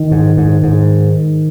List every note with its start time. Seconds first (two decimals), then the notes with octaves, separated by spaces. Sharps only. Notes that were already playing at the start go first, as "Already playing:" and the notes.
Already playing: D#3
0.11 G#2
0.37 G#2
0.63 G#2